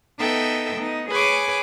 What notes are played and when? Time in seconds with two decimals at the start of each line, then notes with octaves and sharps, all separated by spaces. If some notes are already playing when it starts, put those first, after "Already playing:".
0.20 B3 D#4 A4 E5 G5
0.75 B3 D#4
1.11 G#4 B4 C#5 G#5 D6